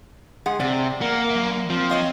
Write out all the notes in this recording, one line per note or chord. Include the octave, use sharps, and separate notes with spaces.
G#3 G#4 F#5
C3 D5
A#3 F#5
F#3 E5
F3 C4
C#5 D#5 F5